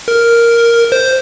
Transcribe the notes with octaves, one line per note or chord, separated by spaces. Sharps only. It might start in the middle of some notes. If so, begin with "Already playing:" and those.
A#4
C5